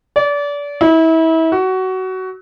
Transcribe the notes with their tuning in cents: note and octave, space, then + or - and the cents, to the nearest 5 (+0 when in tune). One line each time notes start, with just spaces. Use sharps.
D5 -30
E4 -30
F#4 +20